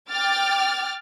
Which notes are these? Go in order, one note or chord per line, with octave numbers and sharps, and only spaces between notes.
G5 D6 F6 A6